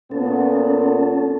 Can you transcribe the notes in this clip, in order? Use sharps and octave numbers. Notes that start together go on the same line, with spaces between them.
A#2 B3 C#4 A4